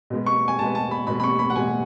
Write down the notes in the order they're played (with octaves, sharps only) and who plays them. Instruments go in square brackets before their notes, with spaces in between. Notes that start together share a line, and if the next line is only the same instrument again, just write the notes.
[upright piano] B2 G#3 B3
C#6
G#5
B2 G#3 B3 A5
A5
B5
B2 G#3 B3 B5
B5
C#6
B5
F#5
B2 G#3 B3 G#5